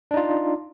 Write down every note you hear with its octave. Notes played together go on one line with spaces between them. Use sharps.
D4 D#4 F4